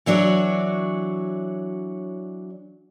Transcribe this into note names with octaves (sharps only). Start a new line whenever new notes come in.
E3 F#3 D4 F#4 C#5